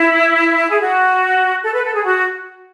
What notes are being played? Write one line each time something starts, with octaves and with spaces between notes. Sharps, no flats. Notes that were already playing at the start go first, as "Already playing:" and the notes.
Already playing: E4
G#4
F#4
A4
B4
A4
G#4
F#4